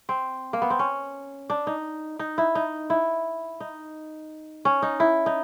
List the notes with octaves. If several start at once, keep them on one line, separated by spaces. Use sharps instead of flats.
C4
A#3
B3
C4
C#4
D4
D#4
D#4
E4
D#4
E4
D#4
C#4
D#4
E4
D#4